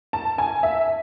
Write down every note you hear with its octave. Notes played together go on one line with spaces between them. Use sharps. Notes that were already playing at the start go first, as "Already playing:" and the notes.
A5
G#5
E5